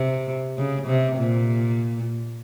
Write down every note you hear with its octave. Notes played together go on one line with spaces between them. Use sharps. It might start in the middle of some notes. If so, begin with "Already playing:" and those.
Already playing: C3
C#3
C3
A#2